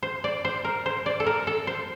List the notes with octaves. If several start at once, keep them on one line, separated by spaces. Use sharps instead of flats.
C5
D5
C5
A#4
C5
D5
A4
A#4
A4
C5